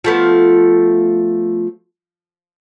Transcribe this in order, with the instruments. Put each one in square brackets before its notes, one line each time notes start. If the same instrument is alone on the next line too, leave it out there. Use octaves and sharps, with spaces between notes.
[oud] F3 A3 B3